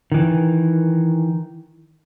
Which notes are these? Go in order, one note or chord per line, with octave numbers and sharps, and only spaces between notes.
D#3 E3